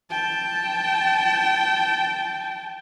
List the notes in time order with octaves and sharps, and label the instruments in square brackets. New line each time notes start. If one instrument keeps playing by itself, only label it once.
[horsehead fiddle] G5 A5